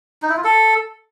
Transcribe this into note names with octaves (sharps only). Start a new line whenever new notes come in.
D#4
E4
F4
A4